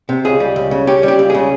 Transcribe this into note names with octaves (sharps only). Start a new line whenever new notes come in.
C3
C#2 G#4
G3
C#2
C#3
C#4 G4
G3 G4
C#2
C#3 G#4